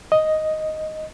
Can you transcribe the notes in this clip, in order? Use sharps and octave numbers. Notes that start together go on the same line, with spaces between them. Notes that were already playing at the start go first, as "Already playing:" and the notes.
D#5